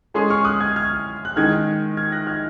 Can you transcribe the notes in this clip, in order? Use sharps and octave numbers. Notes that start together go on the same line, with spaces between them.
G#3 C#4 G#4 G#5 C6
C#6 F6
D#6 F#6
F6 G#6
F6 G#6
F#6
D#3 G#3 D#4 F6 G#6
F6 G#6
F#6 A#6
F6 G#6